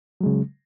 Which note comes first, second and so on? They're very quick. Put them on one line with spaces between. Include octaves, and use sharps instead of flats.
F#3 G#3 C#3